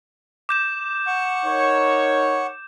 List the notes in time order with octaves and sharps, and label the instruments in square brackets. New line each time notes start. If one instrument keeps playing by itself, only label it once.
[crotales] D6 G6 E7
[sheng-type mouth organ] F#5 C#6
[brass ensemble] D#4 A#4 C#5